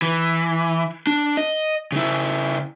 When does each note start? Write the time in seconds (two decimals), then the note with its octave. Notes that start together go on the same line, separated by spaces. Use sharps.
0.02 E3
1.07 D4
1.37 D#5
1.92 C#3 E4